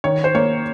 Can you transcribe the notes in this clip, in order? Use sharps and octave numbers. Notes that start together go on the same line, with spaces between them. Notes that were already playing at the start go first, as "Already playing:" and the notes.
D#3 C#5
C5
A#3 C#5